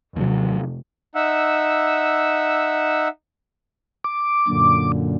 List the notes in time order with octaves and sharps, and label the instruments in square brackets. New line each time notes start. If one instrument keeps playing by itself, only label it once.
[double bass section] F1 [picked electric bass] D#2 F#3
[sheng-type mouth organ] D#4 E5 F#5 E6
[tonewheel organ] D6
[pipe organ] F#2 A#2 D3